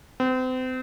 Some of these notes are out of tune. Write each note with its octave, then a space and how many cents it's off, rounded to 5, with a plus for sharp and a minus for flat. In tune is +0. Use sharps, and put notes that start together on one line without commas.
C4 -35